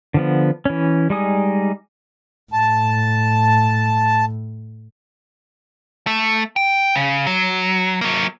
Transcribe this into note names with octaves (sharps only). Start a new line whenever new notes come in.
D3 F3 B3
E3 C#4
G3 G#3 D#4 G#5 D#6
A2 A5
A3
G5
C#3
F#3
F#3 A#3